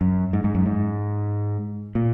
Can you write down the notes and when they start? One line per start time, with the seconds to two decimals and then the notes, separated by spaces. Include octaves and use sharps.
0.01 F#2
0.33 G#2
0.44 G#2
0.55 F#2
0.66 G#2
1.95 A#2